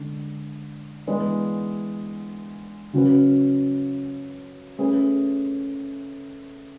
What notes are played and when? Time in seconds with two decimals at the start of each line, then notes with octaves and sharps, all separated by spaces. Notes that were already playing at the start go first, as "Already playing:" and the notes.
Already playing: D3 G#3 D4
1.07 E3 G#3 B3 D4
2.93 C#3 F#3 C#4 F#4 B4
4.78 A3 C#4 G#4 B4